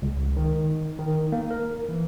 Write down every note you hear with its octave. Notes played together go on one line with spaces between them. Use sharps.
C#2
D#3
D#3
A#3
A#4
E3